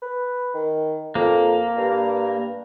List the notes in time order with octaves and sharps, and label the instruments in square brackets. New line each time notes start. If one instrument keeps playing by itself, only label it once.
[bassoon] B4
D#3
[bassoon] F2 [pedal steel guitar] A#3
[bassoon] G2